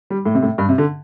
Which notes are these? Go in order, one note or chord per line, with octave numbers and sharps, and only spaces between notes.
G3
A2
C3
A2
G2
C3
D3